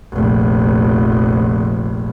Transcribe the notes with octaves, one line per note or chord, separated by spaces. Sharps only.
F1 A#1